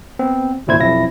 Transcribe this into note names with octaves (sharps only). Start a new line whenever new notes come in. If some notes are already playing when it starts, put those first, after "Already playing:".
B3 C4
G#1 D2 A#2 E4 C5 G#6
B1 F2 F3 E4 A#6